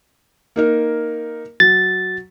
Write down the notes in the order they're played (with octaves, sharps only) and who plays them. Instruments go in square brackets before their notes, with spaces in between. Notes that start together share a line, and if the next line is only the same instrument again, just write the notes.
[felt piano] A#3 D#4 A#4
[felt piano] F#3 [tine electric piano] A6